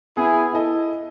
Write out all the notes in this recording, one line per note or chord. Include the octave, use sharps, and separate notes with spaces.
B3 E4 G#4
E4 A4 D#5